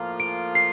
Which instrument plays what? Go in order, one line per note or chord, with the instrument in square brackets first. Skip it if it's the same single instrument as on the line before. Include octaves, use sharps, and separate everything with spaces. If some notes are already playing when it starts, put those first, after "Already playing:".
Already playing: [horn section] A2 F3 A#3 F4
[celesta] D7
C7